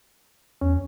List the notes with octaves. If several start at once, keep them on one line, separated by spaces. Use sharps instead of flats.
E2 C#4